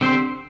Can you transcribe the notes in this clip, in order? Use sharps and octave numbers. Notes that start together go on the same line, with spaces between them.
D3 C4 G4 C5